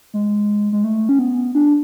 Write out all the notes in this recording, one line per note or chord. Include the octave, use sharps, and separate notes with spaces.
G#3
G#3
A3
C#4
B3
D4